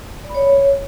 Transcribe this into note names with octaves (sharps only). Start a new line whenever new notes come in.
D5
B5
C#5